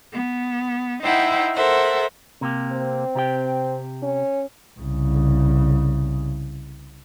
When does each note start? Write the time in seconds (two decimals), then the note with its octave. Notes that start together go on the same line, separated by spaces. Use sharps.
0.12 B3
1.02 D#4 E4 C5 E5 F#5 G5
1.54 A4 A#4 C5 E5 F#5
2.41 C3 A#3 G4
2.73 C4
3.15 C3 G4 G5
4.03 C#4
4.80 C2 C#3